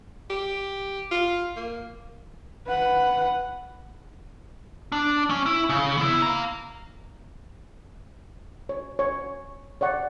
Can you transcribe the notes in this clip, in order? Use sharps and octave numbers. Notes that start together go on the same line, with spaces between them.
G4
F4
A#3
B4 F#5
D4
C#4
E4
C#3
B3 E4
F5 A#5
C#5
C#5
C#5 D5 F#5 C#6